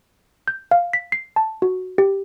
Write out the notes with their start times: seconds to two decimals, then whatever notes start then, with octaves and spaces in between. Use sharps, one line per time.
0.48 G6
0.71 F5
0.93 B6
1.12 C7
1.36 A5
1.62 F#4
1.98 G4